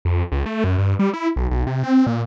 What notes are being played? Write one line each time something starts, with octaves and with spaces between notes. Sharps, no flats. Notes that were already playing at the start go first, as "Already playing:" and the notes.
F2
C#2
A3
F#2
G2
G3
E4
B1
B1
C3
C4
A#2